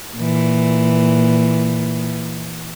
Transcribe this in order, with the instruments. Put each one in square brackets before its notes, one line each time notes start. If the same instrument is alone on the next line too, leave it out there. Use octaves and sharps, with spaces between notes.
[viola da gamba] A#2 E3